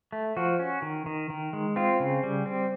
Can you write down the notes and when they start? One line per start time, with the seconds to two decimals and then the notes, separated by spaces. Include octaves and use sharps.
0.12 A3
0.37 F3 F#4
0.59 C#4
0.82 D#3
1.06 D#3
1.30 D#3
1.53 G#3
1.76 C4 F4
2.00 C#3
2.23 G3
2.46 C4